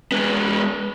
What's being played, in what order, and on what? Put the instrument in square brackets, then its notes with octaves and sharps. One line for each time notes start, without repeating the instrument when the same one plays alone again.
[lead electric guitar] G#3 B3